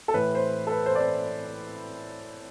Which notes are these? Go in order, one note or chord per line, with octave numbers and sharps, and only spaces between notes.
A4
A2 E3 B4
C5
A4
B4
C5
D5
C5